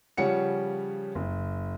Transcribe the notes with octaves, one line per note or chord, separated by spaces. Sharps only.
C#3 F3 G3 C#4 F#5 C#7
F#1